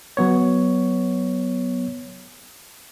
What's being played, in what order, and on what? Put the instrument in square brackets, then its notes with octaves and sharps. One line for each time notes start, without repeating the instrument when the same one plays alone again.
[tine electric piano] F#3 B3 C#5